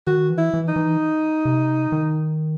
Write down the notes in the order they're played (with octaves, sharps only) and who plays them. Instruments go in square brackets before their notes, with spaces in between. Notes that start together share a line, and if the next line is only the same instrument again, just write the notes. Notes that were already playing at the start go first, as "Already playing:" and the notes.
[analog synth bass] D#3 [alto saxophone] F#4
[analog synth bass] E3
[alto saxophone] E4
[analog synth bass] E3
[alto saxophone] D#4
[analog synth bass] E3
C3
D#3